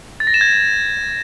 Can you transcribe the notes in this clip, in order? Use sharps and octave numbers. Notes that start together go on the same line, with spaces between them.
A6
A#6
E7
G#6